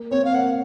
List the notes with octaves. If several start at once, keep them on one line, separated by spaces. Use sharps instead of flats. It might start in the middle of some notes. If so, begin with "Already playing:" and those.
Already playing: A#3
C4 C#5
F5
A#3 F#5